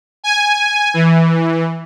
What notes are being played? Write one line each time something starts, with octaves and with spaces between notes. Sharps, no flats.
G#5
E3